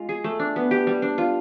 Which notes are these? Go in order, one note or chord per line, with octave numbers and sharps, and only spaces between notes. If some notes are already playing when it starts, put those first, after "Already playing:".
Already playing: G#3 F4
G#4
A3
D4
B3
G4
G3
D4
F4